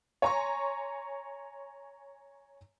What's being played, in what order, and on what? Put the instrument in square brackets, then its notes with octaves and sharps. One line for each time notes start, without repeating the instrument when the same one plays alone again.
[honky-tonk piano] C#5 G#5 A#5 C6 C#6